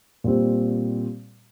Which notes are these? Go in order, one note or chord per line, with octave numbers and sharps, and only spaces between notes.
A#2 G3 C4